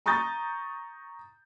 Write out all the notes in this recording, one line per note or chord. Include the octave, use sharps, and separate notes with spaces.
A#5 C#6 D#6 G6 A6